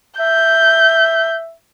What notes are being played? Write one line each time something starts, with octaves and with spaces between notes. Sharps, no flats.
E5 G6